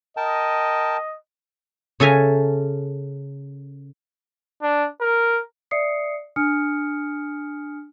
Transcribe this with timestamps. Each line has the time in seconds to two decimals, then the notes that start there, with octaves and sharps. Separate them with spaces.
0.17 A#4 D#5 G5 A5
2.00 C#3 A4 E5 G#5 A#5
4.63 D4
5.01 A#4
5.71 D5 E5 D#6 C7 C#7
6.36 D4 G#5 D#6 F6 C#7